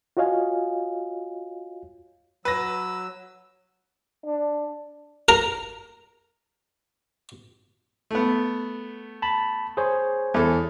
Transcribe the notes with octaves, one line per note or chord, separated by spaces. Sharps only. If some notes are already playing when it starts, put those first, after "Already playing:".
F4 F#4 C#5 D#5 F5 G#5
F#3 B4 E6 A#6
D4
A#4 A#5
A3 B3
A5 B5
G#4 C5 C#5
E2 A4